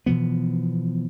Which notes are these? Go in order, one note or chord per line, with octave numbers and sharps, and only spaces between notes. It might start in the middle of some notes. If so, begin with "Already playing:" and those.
B2 E3 F3 B3